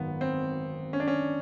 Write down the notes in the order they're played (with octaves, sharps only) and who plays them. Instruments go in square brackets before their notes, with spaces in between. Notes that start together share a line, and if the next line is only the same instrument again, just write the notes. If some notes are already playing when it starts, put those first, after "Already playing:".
Already playing: [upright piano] G#1 F#2 [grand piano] B3
[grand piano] C4
C#4
D4
C#4